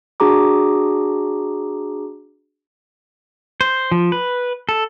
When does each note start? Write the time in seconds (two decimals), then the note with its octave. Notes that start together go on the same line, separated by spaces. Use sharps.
0.20 D4 F#4 G#4 A#5 D6
3.61 C5
3.92 F3
4.12 B4
4.69 A4